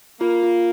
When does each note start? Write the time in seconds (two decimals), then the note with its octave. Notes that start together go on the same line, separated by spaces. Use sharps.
0.20 A#3 F4
0.43 F4